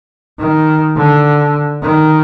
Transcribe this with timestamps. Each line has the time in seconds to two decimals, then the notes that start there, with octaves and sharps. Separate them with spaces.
0.39 D#3
0.97 D3
1.83 D#3